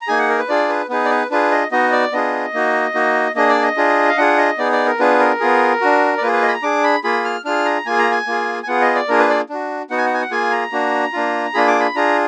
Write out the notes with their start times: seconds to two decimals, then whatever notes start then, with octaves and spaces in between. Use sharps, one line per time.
0.01 A#5
0.08 A#3 D#4 G#4 G#5
0.19 F#5
0.29 A#4
0.38 B4
0.49 D4 F4 G#4 D5
0.69 B4
0.90 B3 D#4 G#4 B4
1.05 D5
1.10 B4
1.31 D4 F4 G#4 B4
1.52 D#5
1.71 B3 D#4 F#4 D#5
1.92 D5
2.13 B3 D4 F4 G#4 D#5
2.54 A#3 D#4 F#4
2.94 A#3 D#4 F#4
3.35 A#3 D4 G#4 D#5
3.49 D5
3.62 D#5
3.77 D4 F4 G#4
4.09 F5
4.17 D4 F4 G#4 F#5
4.38 D#5
4.58 B3 D#4 G#4 D5
4.72 D5
4.86 A#4
4.99 B3 D4 F4 G#4 B4
5.20 A#4
5.40 B3 F4 G#4
5.81 D4 F#4
6.18 D5
6.22 A#3 F4 G#4 B4
6.32 B4
6.42 D#5
6.48 B5
6.53 A#5
6.63 D4 G#4 D6
6.84 B5
7.04 A#3 F4 G#4 B5
7.25 F6
7.45 D4 F4 G#4 F6
7.65 A#5
7.86 A#3 F4 G#4 G#5
7.98 A#5
8.11 G#5
8.27 A#3 F4 G#4
8.63 G#5
8.67 B3 F4 G#4 F#5
8.82 D#5
8.95 D5
9.09 A#3 D4 F4 G#4 A#4
9.19 B4
9.29 D5
9.49 D4 F#4
9.90 B3 D#4 F#4 F#5
9.98 G#5
10.06 F#5
10.14 G#5
10.22 F#5
10.31 A#3 F4 G#4 G#5
10.52 A#5
10.72 A#3 D4 F#4
11.13 A#3 D4 F4
11.54 A#3 D4 F4 G#4 B5
11.67 D6
11.80 B5
11.95 D4 F4 G#4 A#5